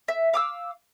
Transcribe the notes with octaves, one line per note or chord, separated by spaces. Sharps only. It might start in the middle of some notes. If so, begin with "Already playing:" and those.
E5
F5 D6 E6